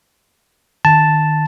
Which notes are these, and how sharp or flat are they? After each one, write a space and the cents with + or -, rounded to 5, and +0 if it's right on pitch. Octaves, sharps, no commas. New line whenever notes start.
D#3 -30 A5 +0